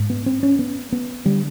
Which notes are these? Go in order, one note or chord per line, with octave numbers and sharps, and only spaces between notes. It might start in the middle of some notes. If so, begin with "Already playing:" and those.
Already playing: G#2
B3
C4
C#4
B3
B3
D3 G3